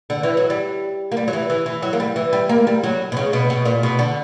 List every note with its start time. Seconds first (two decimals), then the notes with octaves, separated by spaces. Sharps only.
0.10 D3
0.23 E3
0.37 F#3
0.50 G3
1.12 A#3
1.17 G3
1.28 F#3
1.33 E3
1.50 E3
1.66 E3
1.82 F#3
1.93 A#3
2.00 G3
2.16 E3
2.33 G3
2.49 A#3
2.67 G3
2.83 F#3
3.12 B2
3.17 C#3
3.33 B2
3.50 B2
3.65 A#2
3.83 B2
3.99 D3